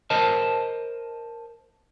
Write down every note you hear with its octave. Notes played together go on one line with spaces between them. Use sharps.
A#4 C5 D#5 A5